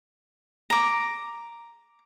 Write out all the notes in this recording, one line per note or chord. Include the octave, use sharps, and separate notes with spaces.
A#5 D6